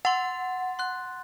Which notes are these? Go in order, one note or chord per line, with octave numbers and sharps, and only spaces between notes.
F#5 C6 A6
C6 F#6